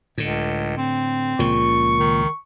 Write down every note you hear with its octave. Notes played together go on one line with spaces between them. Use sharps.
C#2 A2 D3
C4
C#2 A#2 C#3 F3 C#6
D#3